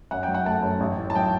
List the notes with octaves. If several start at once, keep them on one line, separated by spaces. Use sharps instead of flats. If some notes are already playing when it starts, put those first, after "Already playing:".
F#2 F#5
F#3 G5
F#5
A3 A5
F#2
A1
A2
A5
F#3 G5